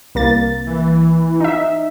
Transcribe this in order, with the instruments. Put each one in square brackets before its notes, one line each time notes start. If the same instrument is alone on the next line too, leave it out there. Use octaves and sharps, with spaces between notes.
[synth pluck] C2 A#3 A6
[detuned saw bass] E3
[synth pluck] D#4 E5